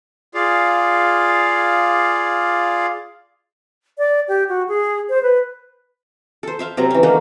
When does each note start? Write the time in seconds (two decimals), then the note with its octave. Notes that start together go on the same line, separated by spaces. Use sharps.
0.34 F4 G#4 D5 F5
3.98 D5
4.28 G4
4.49 F#4
4.68 G#4
5.09 C5
5.23 B4
6.43 A4 C5
6.59 C5 E5 F5
6.77 C3 F#3 C4 A#5
6.91 E3 C#4
7.03 D3 D#3 A3 A#3